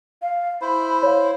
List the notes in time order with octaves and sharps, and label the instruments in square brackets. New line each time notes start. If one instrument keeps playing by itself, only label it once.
[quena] F5
[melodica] E4 C5 [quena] B5
[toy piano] C#5 F5